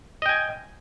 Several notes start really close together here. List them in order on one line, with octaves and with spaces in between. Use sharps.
D#5 G5 G#5